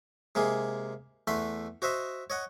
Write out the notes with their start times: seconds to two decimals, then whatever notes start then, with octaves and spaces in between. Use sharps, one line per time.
0.35 C3 G#3 A#3 G#4
1.27 E2 A3 B5 C6
1.82 F#4 C5 D#5 E5
2.30 C#5 D#5 F#5